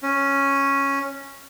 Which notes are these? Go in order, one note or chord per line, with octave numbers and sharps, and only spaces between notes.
C#4